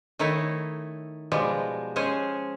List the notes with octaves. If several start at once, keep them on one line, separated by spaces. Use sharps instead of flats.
D#3 A3 D#4 E4 C#5
B2 F3 G3 G#3
G#3 C#4 G#4 C5